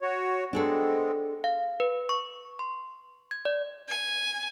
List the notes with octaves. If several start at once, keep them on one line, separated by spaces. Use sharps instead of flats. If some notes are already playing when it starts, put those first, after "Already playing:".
F#4 C#5
G#3 B3 C4 D4 G#4 A4
F5
B4
C#6
C6
G#6
D5
G#5